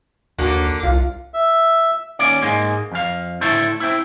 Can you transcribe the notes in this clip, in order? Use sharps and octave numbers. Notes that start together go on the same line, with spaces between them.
D#2 D3 A#3 F#4
C2 F4
E5
D#2 C#4 D5
G#2 G#3 A#3
F2 F5
A2 D3 A3 E4 A4 C5
C4 E4